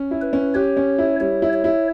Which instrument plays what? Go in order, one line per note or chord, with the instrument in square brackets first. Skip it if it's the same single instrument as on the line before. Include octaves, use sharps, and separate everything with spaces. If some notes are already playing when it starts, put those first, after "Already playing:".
Already playing: [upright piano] C#4
E4
[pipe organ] B4
[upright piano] C#4
[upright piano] G4 [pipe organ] C#5
[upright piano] C#4
E4
[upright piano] G3 [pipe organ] C#5
[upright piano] E4
[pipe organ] C#5
[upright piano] E4